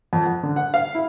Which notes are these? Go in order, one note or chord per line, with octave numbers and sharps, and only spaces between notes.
F2
F#5
D3
F#5
F5
E4